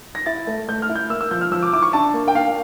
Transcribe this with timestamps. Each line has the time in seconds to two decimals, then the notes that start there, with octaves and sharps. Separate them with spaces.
0.15 A#6
0.26 E4 A6
0.47 A3
0.69 A3 G6
0.82 F6
0.89 E4
0.95 G6
1.10 A#3 E6
1.21 E6
1.31 F3 G6
1.41 F6
1.52 F3 E6
1.62 D6
1.73 E4 D6
1.82 C#6
1.93 D4 A5
2.14 A#3
2.28 G5
2.35 A#3 F5